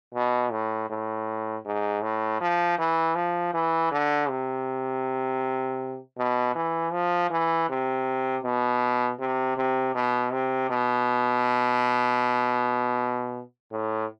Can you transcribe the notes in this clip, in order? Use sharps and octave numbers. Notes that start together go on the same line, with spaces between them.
B2
A2
A2
G#2
A2
F3
E3
F3
E3
D3
C3
B2
E3
F3
E3
C3
B2
C3
C3
B2
C3
B2
A2